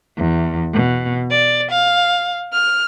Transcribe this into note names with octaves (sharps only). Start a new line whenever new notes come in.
E2
B2
D5
F5
F6